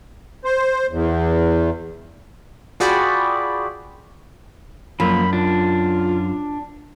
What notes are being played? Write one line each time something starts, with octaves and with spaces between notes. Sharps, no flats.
C5
E2
F4 F#4 G#4 D5 G5 B5
F#2 F3 A#3 B5
D4 F4